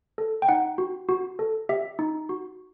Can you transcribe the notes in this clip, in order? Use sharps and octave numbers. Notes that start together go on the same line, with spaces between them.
A4
G5
D#4 F#5
F#4
F#4
A4
G4 E5
D#4
F#4